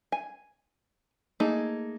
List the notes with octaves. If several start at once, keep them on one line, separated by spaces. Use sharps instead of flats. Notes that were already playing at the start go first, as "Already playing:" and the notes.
G#5
A3 A#3 D#4 G#4